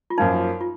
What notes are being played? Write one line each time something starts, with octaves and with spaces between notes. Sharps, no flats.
F4
F#2 F3 A#3 D#4
F4